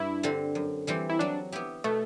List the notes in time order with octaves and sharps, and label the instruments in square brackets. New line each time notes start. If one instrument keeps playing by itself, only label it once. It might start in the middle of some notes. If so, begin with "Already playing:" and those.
Already playing: [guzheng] G2 [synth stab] E4
[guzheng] D3 G3 C4
F#2
E3 G3 C4 G4
[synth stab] E4
[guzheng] F#3 [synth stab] D4
[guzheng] B3 E4 G4
[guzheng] B2 [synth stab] A3